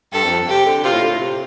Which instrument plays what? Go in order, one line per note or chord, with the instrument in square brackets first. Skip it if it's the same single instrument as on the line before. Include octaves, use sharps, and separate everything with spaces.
[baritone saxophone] G2 [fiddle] A4
[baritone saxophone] F2
[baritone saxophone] C3 [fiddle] G4
[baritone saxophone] D3
[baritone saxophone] C3 [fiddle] F4
[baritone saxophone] A2
D3
A2
C3